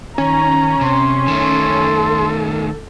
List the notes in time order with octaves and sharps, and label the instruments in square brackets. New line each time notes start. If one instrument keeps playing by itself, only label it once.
[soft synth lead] D#3 [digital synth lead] C#4 [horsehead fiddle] A#5
[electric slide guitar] C3 [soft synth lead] C6
[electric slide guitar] D#3 A3 [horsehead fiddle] A4